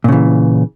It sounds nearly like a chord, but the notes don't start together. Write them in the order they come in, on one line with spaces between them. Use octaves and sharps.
A#2 C#3 E3